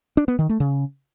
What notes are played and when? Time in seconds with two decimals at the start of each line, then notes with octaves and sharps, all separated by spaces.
0.17 D4
0.28 B3
0.39 D#3
0.49 A3
0.60 C#3